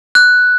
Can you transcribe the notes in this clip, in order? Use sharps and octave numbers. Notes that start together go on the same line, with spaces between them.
F#6